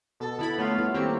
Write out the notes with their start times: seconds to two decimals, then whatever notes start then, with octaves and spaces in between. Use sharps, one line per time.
0.20 B2 A4
0.39 D3 B3 E4 B5
0.58 A3 B3 F4 C#5
0.78 G3 E4 A4
0.94 D#3 A#3 C4 F4 G4 C#6